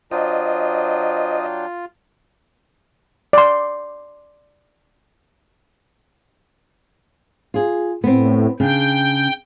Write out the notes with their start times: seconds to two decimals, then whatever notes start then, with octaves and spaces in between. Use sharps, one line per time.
0.11 F#3 D4 F4 C5 D#5 G5
3.33 D5 C6
7.54 F4 G#4
8.04 A2 B3 C4
8.60 C#3 D4 G5